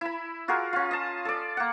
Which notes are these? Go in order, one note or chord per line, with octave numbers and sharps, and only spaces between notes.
E4 B5
F4 F#4 G#4 A#4
C#4 F4
D#5 A5
A4 D5
A#3 F#5